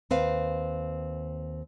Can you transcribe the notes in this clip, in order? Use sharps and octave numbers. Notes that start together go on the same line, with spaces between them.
D#2 C4 B4 F5